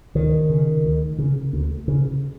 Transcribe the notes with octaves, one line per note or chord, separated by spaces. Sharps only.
D2 D#3
C#3
D2
C#3
D2
C#3